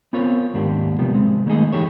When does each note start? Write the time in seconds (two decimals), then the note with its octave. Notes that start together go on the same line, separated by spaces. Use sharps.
0.13 B3 C4 F4 A#4 C#5
0.54 D#2 G#2 A#3 D4 G4
0.99 C3 F3 G3 B3
1.14 G#3 C4
1.46 D#3 A3 A#3 D#4 G#4 D#5
1.72 E3 D#4 G4 A4 C#5